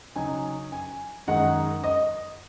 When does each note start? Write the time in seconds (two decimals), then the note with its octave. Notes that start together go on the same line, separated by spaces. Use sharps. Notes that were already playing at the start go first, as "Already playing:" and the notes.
0.16 C#3 F#3 D#4 G#5
0.72 G#5
1.27 F#2 D#3 G#3 D#4 F#5
1.84 D#5